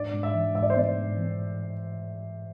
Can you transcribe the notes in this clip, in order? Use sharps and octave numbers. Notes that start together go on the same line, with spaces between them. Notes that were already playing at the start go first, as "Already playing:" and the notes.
Already playing: G#2 D4 D5
G#2
E5
E3
G#2 E5
D5
C5
B3 D5
G#2
E3